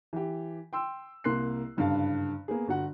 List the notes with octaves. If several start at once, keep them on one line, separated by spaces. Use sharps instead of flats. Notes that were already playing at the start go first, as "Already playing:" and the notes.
E3 G4
G5 C6 E6
C2 A#3 A#4 C6 F#6 C7
F#1 G2 D3 F5 A5
A#3 B3 G#4
G1 F#4 F#5